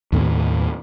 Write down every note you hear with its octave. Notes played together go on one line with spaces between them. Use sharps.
D#2 A2 C4